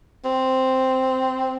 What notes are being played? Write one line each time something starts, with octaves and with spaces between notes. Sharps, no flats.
C4